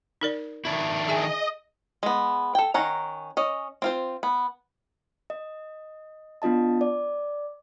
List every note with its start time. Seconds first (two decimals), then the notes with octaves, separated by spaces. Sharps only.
0.21 D#4 A#4 D5
0.65 D#3 D4 E4
1.08 G#4 D#5 E5 G#5
2.03 G#3 B3
2.55 A4 G5
2.74 D#3 C#4 F#5 A#5
3.37 C#4 D#5
3.82 C4 F4 C5
4.23 B3
5.30 D#5
6.42 B3 D4 F4 D#5 A5
6.81 D5